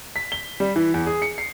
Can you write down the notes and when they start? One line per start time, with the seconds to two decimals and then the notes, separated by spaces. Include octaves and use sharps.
0.16 B6
0.32 G7
0.60 G3
0.76 E3
0.94 E2
1.06 G#4
1.22 C#7
1.38 C7